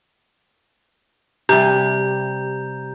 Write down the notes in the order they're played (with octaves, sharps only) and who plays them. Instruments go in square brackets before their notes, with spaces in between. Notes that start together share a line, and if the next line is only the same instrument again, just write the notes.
[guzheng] C3 G3 [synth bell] G4 [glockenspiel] A#5 G6